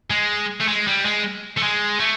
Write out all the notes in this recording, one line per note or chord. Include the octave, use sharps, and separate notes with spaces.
G#3
A3
G#3
G3
G#3
A3
G#3
A3